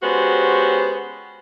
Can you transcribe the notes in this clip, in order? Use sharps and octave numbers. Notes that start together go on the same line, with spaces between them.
G#3 B3 C#4 F#4 G4 C5